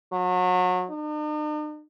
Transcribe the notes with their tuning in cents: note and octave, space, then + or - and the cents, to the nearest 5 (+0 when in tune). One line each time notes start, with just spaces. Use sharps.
F#3 -30
D#4 -45